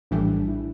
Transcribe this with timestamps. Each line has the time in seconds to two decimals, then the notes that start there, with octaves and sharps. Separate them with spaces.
0.11 A#1 A2 E3 G3 D4
0.48 E4